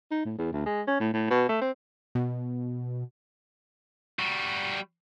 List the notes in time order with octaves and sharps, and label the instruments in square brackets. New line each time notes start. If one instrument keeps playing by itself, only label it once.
[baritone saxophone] D#4
A2
E2
D2
G#3
C#4
A2
A2
B2
A3
C4
[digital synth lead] B2
[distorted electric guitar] G3 F#4